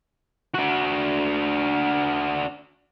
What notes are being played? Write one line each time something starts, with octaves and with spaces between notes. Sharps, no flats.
D4 F#4